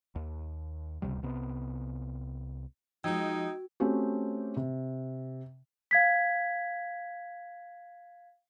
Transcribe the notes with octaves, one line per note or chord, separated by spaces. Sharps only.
D#2
D1 C#2 C3 G3
C2 C3 B3
F3 G#3 D#4 F#4 G5 E6 G#6
A3 C4 C#4 F#4 G4
C3
F5 G#6 B6